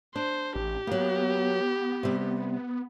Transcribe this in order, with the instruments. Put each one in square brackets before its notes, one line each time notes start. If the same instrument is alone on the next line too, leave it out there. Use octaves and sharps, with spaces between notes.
[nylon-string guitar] D4 [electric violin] C5
[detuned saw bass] A1 [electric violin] G4
[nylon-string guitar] F#3 A#3 [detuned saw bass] B3
[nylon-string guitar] C3 G3